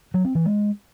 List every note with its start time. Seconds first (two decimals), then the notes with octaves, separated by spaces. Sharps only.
0.14 F#3
0.25 C4
0.35 E3
0.45 G#3